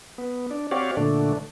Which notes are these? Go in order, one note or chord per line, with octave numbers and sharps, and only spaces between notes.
B3
D4
C4 F#4 G4 C#5 D5 F5
A#2 D3 A3 D4